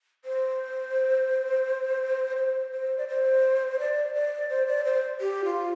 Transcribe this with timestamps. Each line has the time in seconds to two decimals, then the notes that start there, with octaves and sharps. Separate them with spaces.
0.25 C5
2.37 C5
2.72 C5
2.98 D5
3.08 C5
3.79 D5
4.14 D5
4.49 C5
4.67 D5
4.84 C5
5.21 G4
5.44 F4